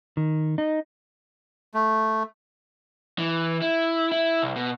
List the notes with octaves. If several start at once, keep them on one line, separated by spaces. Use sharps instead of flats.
D#3
D#4
A3
E3
E4
E4
C2
B2